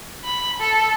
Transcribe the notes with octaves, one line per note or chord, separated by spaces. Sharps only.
B5
A4